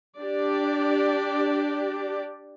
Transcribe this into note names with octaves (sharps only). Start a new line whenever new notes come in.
D4 G4 D5